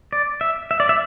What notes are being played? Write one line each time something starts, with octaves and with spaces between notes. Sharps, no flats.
D5
E5
E5
D5
E5